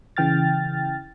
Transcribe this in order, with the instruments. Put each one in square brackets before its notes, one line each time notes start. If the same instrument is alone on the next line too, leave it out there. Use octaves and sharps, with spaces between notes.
[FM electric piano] C#3 E3 G5 F6 A6